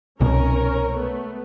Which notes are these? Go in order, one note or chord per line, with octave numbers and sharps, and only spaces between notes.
C2 B2 C#4 A#4 C#5
A3 B3